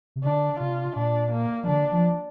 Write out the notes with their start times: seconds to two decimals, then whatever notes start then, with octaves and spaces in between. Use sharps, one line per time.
0.16 C3
0.24 D3 D4
0.60 C3 F4
0.96 A#2 D4
1.32 A#3
1.63 F3
1.68 D3 D4
1.92 F3